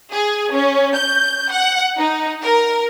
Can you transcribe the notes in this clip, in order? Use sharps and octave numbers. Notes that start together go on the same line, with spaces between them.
G#4
C#4
G6
F#5
D#4
A#4